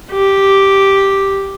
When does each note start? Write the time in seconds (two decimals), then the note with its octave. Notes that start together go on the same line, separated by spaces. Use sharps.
0.12 G4